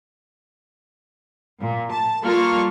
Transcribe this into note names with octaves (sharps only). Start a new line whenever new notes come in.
A#2
A5
G3 A#3 F4 A4 C#6 F6